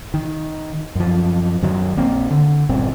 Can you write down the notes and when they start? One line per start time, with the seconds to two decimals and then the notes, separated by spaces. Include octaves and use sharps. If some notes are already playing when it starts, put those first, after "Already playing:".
0.14 D#3
0.95 F#2 F3
1.62 F#2 D#3 F#3
1.97 A#1 A#3 C4
2.30 D3
2.69 G1 A#2 G3 C4